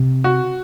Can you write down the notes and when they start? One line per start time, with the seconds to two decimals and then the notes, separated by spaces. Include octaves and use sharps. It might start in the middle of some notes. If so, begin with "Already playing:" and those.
Already playing: C3
0.24 F#4